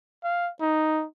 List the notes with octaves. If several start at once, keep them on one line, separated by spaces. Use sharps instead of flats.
F5
D#4